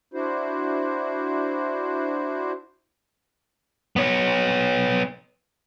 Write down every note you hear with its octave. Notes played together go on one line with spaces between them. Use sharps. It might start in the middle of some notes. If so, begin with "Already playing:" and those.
D4 E4 F#4 C5
B3 C#5